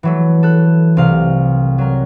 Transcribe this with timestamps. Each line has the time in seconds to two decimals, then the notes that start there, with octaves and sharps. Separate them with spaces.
0.03 E3 F#3 A3
0.43 A4 F#6
0.97 C2 C3 F5
1.78 F#3 A#4